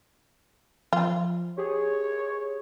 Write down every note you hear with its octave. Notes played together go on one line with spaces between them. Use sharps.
F3 F4
G4 G#4 C#5